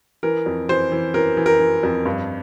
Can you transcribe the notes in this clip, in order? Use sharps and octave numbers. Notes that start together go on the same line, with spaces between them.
E3 A#4
F2
E3 C5
E3
E3 A#4
E3
A#4
E3
F2
G2